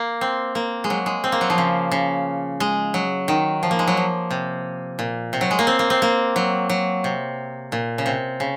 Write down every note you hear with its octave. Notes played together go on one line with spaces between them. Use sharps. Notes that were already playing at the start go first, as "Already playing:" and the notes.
Already playing: A#3
C4
A#3
G#3
F#3
G#3
C4
A#3
F#3
F3
C#3
C#3
G#3
F#3
D#3
F3
A#3
G#3
F#3
F3
C3
A#2
C3
F#3
G#3
A#3
C4
A#3
C4
A#3
F#3
F#3
C3
A#2
C#3
C3
C#3